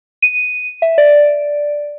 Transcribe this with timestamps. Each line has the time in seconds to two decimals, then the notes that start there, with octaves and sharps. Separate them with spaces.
0.22 D#7
0.82 E5
0.98 D5